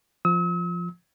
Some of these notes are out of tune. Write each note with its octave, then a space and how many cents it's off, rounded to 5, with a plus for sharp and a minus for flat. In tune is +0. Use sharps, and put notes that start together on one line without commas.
F3 +0 E6 -45